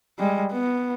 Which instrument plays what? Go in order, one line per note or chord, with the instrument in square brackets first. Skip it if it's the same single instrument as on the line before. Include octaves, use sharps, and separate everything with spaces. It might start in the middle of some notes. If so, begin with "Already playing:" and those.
[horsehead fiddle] G3 G#3
B3